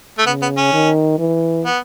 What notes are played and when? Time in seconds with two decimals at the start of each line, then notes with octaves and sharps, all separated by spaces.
0.18 A3
0.26 C#3 B3
0.42 B3
0.57 C#4
0.73 D#3
1.18 E3
1.65 B3